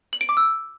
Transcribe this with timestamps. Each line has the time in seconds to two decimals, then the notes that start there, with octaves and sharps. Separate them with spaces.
0.13 F#7
0.21 D7
0.29 D6
0.37 E6